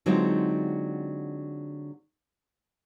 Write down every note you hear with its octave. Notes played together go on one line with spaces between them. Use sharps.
D3 F#3 G#3 C4 D#4 F4